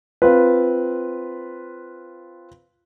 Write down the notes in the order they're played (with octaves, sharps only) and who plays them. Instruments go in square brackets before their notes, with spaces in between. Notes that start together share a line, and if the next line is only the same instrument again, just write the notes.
[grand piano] C4 F4 B4